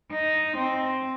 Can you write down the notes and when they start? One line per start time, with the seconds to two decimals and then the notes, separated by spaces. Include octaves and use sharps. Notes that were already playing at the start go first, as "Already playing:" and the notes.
0.11 D#4
0.57 C4